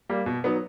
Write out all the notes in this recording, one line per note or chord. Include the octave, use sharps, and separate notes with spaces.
G3 A#3
B2
F#3 B3 D#4